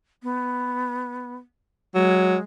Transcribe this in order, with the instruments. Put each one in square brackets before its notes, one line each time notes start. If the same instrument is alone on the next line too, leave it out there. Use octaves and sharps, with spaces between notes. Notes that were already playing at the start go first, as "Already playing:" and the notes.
[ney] B3
[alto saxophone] F#3 [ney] G#3